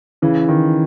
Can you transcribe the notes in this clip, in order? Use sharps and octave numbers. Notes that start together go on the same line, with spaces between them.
C#3 E3
D#3